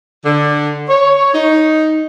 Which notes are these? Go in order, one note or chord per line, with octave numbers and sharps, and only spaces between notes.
D3
C#5
D#4